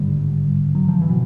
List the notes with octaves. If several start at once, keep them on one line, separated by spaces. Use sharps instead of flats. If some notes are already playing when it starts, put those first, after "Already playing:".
Already playing: G#1 G2 D3 G3
F#3
F3
E3
B2